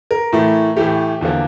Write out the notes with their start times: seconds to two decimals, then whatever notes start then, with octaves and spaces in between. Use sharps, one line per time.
0.11 A#4
0.33 A2 E3 A3
0.76 A2 E3 A3 G4
1.21 E2 D3 F3 A#3